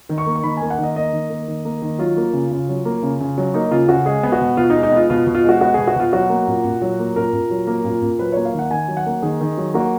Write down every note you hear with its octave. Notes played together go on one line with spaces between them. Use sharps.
D#3
C#6
A#3
C#6
D#3 B5
A#3 G#5
F#5
D#3 D#5
A#3 D#5
D#3
A#3
D#3
A#3
D#3
F#3 F4
A#3
C#3
C#3
F#3
A#3
C#3
C#3
F#3
A#3 D#4
C#3 F4
C#3 F#4
G#3 G#4
B3
F#4
B2
B2 F4
D#4
G#3
D#4
B3 F4
B2 F4
B2
F4
G#3
F#4
B3 F#4
B2 G#4
F#4
B2 F4
F#3 F#4
A#3
A#2
A#2
F#3
A#3
A#2 A#4
A#2
F#3
A#3
A#2
A#2
F#3 B4
A#3 C#5
F5
D#3
F#5
D#3 G#5
F#3
F#5
A#3
D#3 G#4
D#3
F#3
A#3 F#4